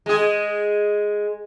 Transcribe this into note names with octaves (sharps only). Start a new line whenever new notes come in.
G#3 G#4